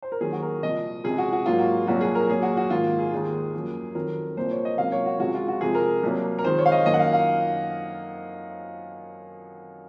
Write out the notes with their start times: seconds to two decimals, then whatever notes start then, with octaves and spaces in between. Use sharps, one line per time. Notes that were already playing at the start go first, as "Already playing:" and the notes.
0.02 C5
0.12 A#4
0.21 D#2 D#3 F#3 G#4
0.32 F#4
0.42 A#4
0.62 C2 A#2 F3 D#5
1.04 C#2 C3 F3 G#3 G#4
1.18 F#4
1.33 F#4
1.46 G#2 F#3 A#3 F4
1.59 F#4
1.87 C2 A#2 F#3 A#3 F#4
2.01 G#4
2.15 A#4
2.29 A#2 F#3 A#3 G#4
2.42 F#4
2.57 F#4
2.70 G#2 D#3 A#3 F4
2.99 G#4
3.13 D#2 D#3 G#3
3.54 F#2 F3 A#3
3.95 F2 D#3 F#3 A#4
4.37 C2 A#2 F3 A#3 C5
4.51 C#5
4.65 D#5
4.78 C#2 C3 F#3 A#3 F5
4.92 C#5
5.06 F#4
5.20 C#2 C3 F3 G#3 F#4
5.34 F4
5.48 F#4
5.61 F2 C3 F3 G#3 G#4
5.75 A#4
6.03 C2 C3 F#3 A#3
6.38 A#4
6.44 F2 D#3 G#3 C5
6.58 C#5
6.66 F5
6.72 D#5
6.86 F#2 D#3 A#3 D#5
6.94 F#5
6.99 F5
7.13 F5